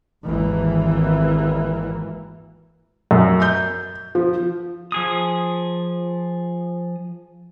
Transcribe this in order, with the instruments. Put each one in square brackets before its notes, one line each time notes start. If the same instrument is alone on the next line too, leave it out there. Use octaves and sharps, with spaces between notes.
[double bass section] G#1 D#2 E3 A#3
[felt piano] F#2
G6
F3
[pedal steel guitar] F3 G#4 D#6